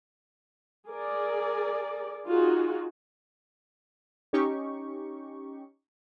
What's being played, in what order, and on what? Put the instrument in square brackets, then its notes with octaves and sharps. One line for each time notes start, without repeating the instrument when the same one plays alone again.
[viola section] G#4 A#4 D5
D#4 F4 F#4 G#4
[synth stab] C#4 D#4 G4 C#6